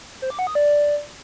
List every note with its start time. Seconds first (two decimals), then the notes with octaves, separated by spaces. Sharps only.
0.22 C5
0.30 D6
0.39 F#5
0.47 D#6
0.55 D5